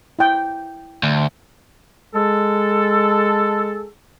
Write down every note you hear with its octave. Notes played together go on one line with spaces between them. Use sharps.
E4 G5
D2
G#3 A4